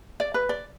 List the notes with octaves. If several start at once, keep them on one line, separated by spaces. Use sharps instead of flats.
D5
B4
D5